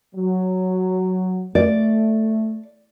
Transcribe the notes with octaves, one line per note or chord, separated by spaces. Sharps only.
F#3
A3 D5